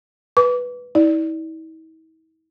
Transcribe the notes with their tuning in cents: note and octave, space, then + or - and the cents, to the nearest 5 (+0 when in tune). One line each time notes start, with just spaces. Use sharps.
B4 -5 D6 -35
E4 -45 D5 +0